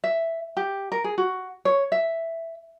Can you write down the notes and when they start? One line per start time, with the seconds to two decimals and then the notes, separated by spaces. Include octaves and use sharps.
0.04 E5
0.57 G4
0.92 A#4
1.04 G#4
1.18 F#4
1.65 C#5
1.92 E5